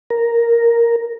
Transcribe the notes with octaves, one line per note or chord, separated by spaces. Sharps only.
A#4